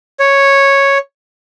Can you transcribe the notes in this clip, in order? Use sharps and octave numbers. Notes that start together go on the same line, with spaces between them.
C#5